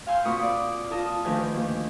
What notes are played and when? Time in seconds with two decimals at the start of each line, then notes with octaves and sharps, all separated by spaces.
0.07 F5 G#5 C6 E6 G6
0.25 A#2 C4 F#4 B5 C#6 D#6
0.42 D5
0.91 F4 A#4 A5 D#6
1.24 D2 D#3 F3 G4 B4 G#5
1.54 A#3 G4